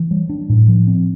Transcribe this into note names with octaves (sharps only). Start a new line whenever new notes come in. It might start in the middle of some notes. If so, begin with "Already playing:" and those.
Already playing: E3
G3
D4
A2
F3
C4